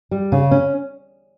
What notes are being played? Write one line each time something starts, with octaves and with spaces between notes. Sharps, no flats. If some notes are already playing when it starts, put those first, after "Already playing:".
G3
C#3
C#4